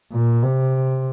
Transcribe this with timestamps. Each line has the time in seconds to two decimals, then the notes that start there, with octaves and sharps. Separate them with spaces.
0.12 A#2
0.43 C3